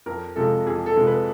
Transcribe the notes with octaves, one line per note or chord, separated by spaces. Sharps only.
F2 A#4
C3 F3 G#3 A4
F2 G#4
A4
C3 F3 G#3
B4